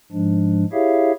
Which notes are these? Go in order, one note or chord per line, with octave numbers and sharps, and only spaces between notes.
G#2 F3 G#3 D4
E4 G4 G#4 C#5 E5 F5